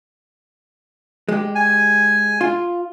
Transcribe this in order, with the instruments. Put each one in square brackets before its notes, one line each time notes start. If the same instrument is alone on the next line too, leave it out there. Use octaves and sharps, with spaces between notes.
[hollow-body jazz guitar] G#3 G4
[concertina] G#5
[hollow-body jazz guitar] F4